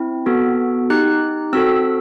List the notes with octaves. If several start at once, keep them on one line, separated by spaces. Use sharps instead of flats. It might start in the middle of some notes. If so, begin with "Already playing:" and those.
Already playing: C4 E4
B3 F#4 A4
D#4 G4 F#6
C4 F#4 A4 E6